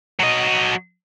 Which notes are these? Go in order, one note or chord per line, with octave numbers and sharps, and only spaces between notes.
F#3 D#5